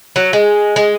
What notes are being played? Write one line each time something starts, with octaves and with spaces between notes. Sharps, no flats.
F#3
G#3
G#3